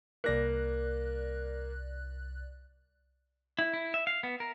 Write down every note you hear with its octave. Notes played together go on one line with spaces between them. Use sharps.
C2 A#3 D5 F#6 A#6
E4
E4
E5
F5
B3
A#4